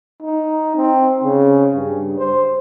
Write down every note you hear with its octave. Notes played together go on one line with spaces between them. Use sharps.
D#4
C4
C#3
G2
C5